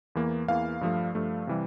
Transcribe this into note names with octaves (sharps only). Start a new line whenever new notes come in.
E2 E3 A#3
E2 E3 A#3 F5
G2 F3 A3
G2 F3 A3
C3 E3 G3